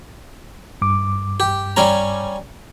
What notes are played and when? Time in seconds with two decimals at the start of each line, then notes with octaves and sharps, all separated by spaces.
0.82 G2 D6
1.40 G4
1.77 G3 C#4 A#5